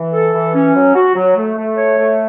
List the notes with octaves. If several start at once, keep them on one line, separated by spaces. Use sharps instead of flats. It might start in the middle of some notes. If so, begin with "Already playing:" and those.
Already playing: E3
A4
E3
C#4
F#3
F#4
F#3
A3
A3
C#5
A3